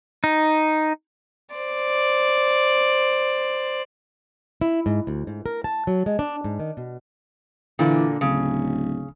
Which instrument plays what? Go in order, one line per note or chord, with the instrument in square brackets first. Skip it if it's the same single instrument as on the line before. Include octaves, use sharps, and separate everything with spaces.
[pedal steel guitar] D#4
[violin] C5 D5
[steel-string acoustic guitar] E4
G#2
D2
G#2
A#4
A5
F#3
G#3
D4
G#2
D#3
B2
[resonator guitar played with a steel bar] A#2 D3 [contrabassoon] E3
[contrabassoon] D1 [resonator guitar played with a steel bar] C#3